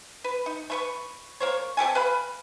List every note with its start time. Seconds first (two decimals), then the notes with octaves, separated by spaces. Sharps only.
0.24 B4
0.46 D#4
0.70 A3 B4 C#6
1.40 A#3 C5 C#5
1.77 C4 G4 A4 G#5
1.95 B4 F5 B5